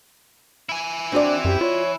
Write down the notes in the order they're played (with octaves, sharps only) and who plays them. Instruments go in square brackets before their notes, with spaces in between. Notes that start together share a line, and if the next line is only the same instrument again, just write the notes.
[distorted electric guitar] E4 G#5
[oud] C4 F#4 D5 [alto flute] D4
[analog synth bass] F#2 [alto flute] G4
[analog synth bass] F4 [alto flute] C#5